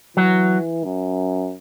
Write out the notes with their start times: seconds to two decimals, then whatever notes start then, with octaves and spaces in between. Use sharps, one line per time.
0.17 E3 F#3
0.84 F#2